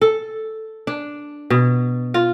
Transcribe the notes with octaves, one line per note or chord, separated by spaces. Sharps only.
A4
D4
B2
F4